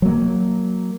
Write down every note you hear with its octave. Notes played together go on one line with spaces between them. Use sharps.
F#3 A#3